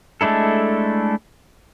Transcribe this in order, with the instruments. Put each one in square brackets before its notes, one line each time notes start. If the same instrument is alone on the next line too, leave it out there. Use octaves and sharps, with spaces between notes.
[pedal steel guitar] G#3 A3 D4 E4 A4